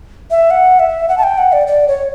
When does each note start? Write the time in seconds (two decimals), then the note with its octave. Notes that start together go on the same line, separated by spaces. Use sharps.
0.31 E5
0.51 F#5
0.80 E5
1.09 F#5
1.18 A5
1.23 G5
1.38 F#5
1.52 D5
1.67 D5
1.88 C#5